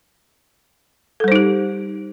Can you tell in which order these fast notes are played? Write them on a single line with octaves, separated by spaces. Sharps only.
A4 G3 C5 D#4 G4